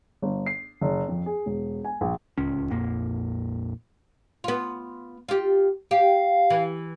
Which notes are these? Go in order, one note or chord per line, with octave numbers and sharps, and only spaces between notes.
G1
C7
F#1
F2
G#4
E1
G#5
A#1
D1 C#2 C#4
A#1 F2 A#2 A#3
B3 F4
F4 G4
G4 F5
E3